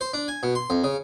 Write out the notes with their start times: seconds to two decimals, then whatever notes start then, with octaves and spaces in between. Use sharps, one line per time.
0.01 C5
0.13 D4
0.28 G#5
0.43 B2
0.55 C6
0.70 F2
0.84 C#3